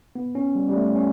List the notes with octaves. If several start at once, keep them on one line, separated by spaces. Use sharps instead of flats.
B3
C#4
G3
G3
A3
C#4